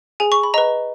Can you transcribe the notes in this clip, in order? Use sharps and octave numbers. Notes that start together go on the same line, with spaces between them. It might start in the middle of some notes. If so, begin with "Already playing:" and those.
G#4 G#5
C#6
B5
B4 D#5 A#5